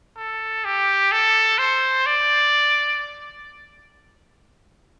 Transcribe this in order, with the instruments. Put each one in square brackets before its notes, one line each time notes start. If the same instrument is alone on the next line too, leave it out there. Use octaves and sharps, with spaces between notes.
[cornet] A4
G4
A4
C5
D5